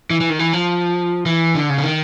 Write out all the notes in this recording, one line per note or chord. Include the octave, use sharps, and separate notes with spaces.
E3
E3
D#3
E3
F3
E3
D3
C#3
D3
D#3